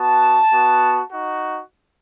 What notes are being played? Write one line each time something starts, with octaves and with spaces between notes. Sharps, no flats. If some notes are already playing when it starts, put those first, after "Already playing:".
Already playing: B3 F#4 A5
B3 F#4
D#4 F#4